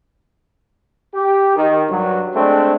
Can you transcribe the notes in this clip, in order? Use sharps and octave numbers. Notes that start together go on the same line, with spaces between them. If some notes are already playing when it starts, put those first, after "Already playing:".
G4
D#3
G2 F#3
G#3 A3 C4 D4